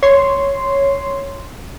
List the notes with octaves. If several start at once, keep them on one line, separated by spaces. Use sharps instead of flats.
C#5 C6